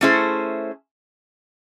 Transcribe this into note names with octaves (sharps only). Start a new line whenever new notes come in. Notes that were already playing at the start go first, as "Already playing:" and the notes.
A3 C#4 E4 G#4 C5